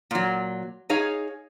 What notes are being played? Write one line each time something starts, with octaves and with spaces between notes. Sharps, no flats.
A#2 F#3
D#4 G#4 C#5 F5